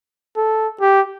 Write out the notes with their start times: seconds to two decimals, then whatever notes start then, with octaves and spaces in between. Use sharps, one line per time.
0.36 A4
0.81 G4